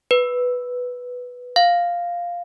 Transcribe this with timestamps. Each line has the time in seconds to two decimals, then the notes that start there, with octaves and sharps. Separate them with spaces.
0.11 B4
1.56 F5